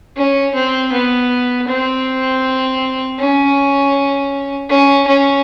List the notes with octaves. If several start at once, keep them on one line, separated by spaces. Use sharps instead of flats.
C#4
C4
B3
C4
C#4
C#4
C#4